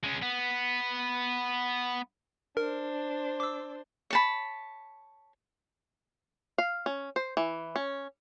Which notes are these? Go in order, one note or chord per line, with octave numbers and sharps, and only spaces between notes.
G#3 C#4
B3
D4 A#4 C5
D6 E6
C#5 A5 B5
F5
C#4
C5
E3
C#4